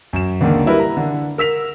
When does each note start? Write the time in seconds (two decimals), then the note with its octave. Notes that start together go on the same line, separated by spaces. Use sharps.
0.13 F#2 E7
0.41 C#2 D3 D#3 A#3
0.66 G3 E4 A#4 B4
0.80 A#5
0.97 D3
1.38 A#4 E6 B6 F7